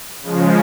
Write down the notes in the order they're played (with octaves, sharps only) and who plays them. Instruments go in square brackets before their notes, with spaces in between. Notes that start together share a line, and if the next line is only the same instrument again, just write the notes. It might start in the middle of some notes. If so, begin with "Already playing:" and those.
[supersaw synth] C#3 F3 G#3